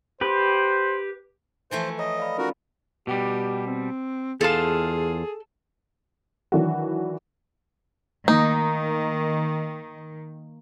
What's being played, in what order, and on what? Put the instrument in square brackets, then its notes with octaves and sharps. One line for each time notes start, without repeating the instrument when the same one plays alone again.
[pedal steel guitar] G4 B4 [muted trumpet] C5
[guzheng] E3 F3 A3 [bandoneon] C5
[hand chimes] C#5 A#5 D#6 [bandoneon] D#5
[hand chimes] D5 F5 B5
[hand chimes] C#4 D#4 F4 [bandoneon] F#4 A#4
[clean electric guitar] B2 G3 [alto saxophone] G4
[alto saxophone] C4
[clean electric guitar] E2 F4 F5 [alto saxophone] G#4 [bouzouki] A4 A5
[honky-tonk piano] D#3 E3 F#3 D4 E4 F#4
[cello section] D#3 [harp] A#3 [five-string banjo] D#4